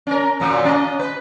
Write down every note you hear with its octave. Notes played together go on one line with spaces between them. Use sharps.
C#4 A#4
F#2 A#2 F#3
C#4 D#5
B4